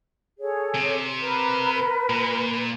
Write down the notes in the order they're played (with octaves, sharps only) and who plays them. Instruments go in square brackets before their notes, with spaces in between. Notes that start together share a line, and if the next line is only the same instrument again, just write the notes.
[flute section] G#4 A4 C#5
[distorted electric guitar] C3
[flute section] A#4 B4
[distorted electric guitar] A#2